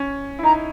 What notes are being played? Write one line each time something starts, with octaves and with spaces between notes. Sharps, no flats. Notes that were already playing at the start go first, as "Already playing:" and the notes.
Already playing: C#4
E4
D#4 A#5